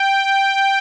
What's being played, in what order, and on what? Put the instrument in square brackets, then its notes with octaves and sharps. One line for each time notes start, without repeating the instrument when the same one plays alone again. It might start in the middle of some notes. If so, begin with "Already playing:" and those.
Already playing: [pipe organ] G5